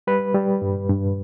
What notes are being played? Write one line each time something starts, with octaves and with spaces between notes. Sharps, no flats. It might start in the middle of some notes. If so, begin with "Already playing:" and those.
G3 B4
G3
G2
G2